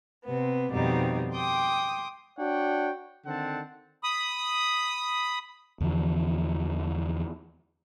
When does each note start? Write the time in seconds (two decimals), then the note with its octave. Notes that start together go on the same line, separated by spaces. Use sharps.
0.25 C3 B3
0.71 F2 B2 D#3 G3 D#4
1.34 G5 C6 D6 D#6
2.38 D4 F#4 C#5 F#5 G5
3.26 D3 D#3 C4 F#5 A5
4.04 B5 D#6
5.80 E2 D3 E3 F3